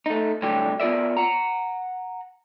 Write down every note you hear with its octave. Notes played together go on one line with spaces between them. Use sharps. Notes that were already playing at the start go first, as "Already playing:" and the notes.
A3 D#4
C2 A2 D3 F#3 G3 G4
B3 F4 A#4 D5 E5
F#5 A#5